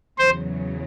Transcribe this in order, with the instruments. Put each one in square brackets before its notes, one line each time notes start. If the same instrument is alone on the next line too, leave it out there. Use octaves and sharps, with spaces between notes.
[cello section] E2 C#3 F#3 [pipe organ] C5